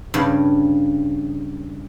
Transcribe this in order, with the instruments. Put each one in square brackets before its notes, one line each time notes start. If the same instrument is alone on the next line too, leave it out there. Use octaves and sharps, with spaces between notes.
[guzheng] G2 C#3